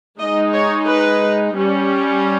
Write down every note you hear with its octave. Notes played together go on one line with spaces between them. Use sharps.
G#3 D#4 D#5
C#5
B4
G3 C#4